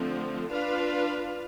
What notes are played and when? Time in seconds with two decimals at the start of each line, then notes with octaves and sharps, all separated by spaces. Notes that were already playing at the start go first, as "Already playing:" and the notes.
Already playing: D3 F3 A3 C4
0.49 D4 F4 B4 F5